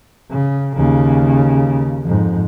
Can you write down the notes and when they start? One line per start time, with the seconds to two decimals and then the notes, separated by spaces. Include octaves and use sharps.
0.30 C#3
0.76 D#2 C#3
2.03 F2 G#2